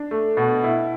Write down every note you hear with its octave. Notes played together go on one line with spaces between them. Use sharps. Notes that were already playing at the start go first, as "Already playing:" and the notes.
Already playing: D4
A3
B2
E4